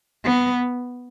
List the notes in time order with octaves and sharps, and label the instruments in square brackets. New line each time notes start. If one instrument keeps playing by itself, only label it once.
[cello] B3